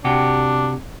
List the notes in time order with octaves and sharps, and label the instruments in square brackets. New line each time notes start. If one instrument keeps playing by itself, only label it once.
[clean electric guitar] C3 F#4 G4 [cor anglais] D4